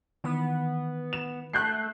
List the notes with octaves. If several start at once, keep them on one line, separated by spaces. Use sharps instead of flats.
D#3 E3 B3 B4
E7
A3 F#6 G6 C7